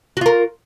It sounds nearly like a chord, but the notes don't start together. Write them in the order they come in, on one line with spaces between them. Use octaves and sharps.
F#4 F4 A#4